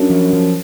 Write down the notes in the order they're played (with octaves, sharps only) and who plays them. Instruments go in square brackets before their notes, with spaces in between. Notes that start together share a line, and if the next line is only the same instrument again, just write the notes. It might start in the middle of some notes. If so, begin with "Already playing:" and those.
Already playing: [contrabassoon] F#2 [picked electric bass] D4
[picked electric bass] F3
F3